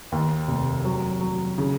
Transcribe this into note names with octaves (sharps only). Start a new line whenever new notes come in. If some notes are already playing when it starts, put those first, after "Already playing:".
D#2
F1
F#3
F#3
C#3